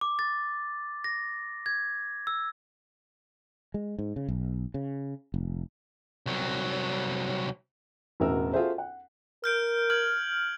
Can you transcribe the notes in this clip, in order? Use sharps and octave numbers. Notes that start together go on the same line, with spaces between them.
D6
A6
A#6
G#6
E6
G#3
G#2
C#3
B1
C#3
F1
C2 F#3
E1 A1 F#4 A#4 E6
F4 F#4 G#4 A4 C5 E5
F#5
A#4 F6 G6 D7
F6 G#6 F#7